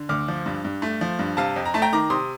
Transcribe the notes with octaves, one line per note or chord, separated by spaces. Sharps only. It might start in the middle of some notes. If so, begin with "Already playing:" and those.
Already playing: D3
D2 D6 F6
F3
G2
G2
A3
F3
G2
C3 F5 A5
F2
A#5
A3 A5
G5 A#5
D#3 A#5 D6
C3 C6 D#6